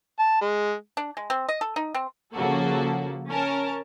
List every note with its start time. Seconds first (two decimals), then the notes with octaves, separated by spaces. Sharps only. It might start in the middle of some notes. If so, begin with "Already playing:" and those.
0.19 A5
0.41 G#3
0.97 D4
1.17 G#3
1.30 C4
1.49 D#5
1.61 A4
1.76 D#4
1.94 C4
2.34 C#3 F3 A#3 F#4 A4
3.30 C#4 A#4 A5